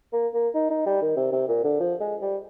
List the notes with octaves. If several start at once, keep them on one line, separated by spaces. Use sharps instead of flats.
A#3
A#3
D#4
D#4
G3
D#3
C3
C3
A#2
D3
F3
G#3
G3